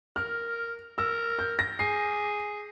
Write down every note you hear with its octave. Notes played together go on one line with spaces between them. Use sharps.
A#4 F6
A#4 E6
G6
A#6
G#4 C7